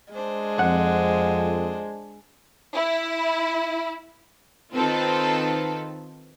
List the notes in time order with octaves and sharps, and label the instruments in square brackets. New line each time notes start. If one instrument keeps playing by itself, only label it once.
[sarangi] G#3 [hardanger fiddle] D4 C5
[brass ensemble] F2 [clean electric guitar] F#5
[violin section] E4
[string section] D#3 C4 D#4 F4 A4 B4